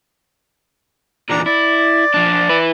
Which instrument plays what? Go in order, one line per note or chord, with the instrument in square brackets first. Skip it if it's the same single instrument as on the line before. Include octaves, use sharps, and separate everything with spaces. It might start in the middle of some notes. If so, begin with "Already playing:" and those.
[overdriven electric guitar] E2 A#2 [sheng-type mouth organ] D4 A#5
[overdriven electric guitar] E4 [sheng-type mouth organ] D5
[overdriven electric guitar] F3 D4
E4 B4